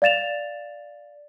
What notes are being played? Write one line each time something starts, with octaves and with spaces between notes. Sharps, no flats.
D5 F5 A6 E7 F7